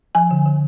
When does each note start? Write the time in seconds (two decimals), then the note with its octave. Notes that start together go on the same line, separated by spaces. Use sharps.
0.15 F3 G#5
0.31 D3
0.46 D3